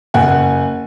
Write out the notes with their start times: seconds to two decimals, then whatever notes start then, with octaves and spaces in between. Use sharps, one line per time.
0.14 F#1 F#5 G#5